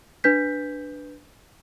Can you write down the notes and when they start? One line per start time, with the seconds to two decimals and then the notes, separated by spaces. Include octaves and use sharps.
0.24 D4 B4 G6 B6